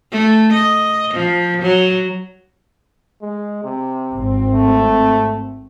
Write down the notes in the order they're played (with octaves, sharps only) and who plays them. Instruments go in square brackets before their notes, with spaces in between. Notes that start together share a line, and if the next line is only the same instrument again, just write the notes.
[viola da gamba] A3
D#5
F3
F#3
[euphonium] G#3
C3
[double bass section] G#1 C4
[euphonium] A3